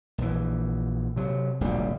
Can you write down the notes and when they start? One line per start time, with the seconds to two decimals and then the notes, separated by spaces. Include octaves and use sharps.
0.18 A#1 E3
1.16 C3 F#3
1.61 D1 A#1 B2 G3